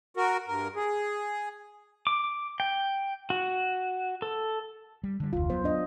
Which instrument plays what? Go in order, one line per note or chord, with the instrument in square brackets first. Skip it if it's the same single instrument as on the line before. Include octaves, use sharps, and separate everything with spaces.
[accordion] F#4 A#4
G2 A#4
G#4
[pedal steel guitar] D6
G5
F#4
A4
[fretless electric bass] G3
D3 G3
[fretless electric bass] F1 D2 [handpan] F4
[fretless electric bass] F#3 B3 [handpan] C5
[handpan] D4 D#5